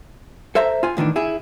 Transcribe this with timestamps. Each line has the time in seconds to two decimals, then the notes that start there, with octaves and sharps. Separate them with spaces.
0.55 A4 C5 E5 A#5
0.83 F4 G#5
0.97 A2 D#3 E3 D4
1.16 E4 G#4